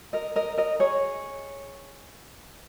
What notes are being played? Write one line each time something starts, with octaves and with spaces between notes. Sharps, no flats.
A#4 D#5
A#4 D#5
A#4 D#5
G#4 C#5